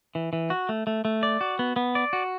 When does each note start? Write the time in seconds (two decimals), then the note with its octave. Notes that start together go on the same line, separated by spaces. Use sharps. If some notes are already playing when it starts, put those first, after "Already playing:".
0.15 E3
0.33 E3
0.50 F#4
0.69 A3
0.87 A3
1.05 A3
1.23 D5
1.41 F#4
1.59 B3
1.76 B3
1.95 D5
2.13 F#4